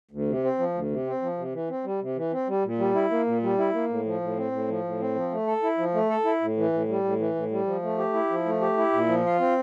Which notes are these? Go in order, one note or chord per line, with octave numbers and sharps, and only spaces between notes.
D2
C3
C4
F3
D2
C3
C4
F3
C3
E3
C4
G3
C3
E3
C4
G3
A#2
G3
E4
A#3
A#2
G3
E4
A#3
A2
F3
A2
C4
A2
F3
A2
C4
F3
A3
A4
E4
F3
A3
A4
E4
A2
E3
A2
G3
A2
E3
A2
G3
F3
A3
G4
E4
F3
A3
G4
E4
A#2
F3
F4
C4